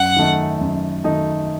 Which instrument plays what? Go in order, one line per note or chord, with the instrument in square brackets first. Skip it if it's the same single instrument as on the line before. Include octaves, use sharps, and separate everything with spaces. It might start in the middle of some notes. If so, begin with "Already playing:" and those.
Already playing: [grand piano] F#2 [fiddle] F#5
[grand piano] D#3 A3 D#4
F#2
D#3 A3 D#4